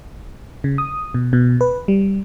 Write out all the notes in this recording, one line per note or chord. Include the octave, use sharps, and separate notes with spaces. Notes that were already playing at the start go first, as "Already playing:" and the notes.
C#3
D#6
B2
B2
B4
G3